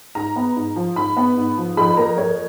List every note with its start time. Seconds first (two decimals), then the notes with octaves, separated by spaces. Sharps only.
0.15 G#2 A#5
0.36 B3
0.56 G#2
0.76 F3
0.96 G#2 B5
1.17 B3
1.37 G#2
1.57 F3
1.77 F2 B5
1.97 A#3 A#5
2.18 F2 C#5